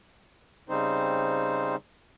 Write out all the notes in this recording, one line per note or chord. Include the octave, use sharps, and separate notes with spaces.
C#3 G3 C4 D#4 C5